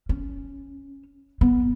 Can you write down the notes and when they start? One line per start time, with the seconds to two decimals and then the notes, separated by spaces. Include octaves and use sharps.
0.09 C#4
1.41 B3